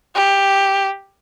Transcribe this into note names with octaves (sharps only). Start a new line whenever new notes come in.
G4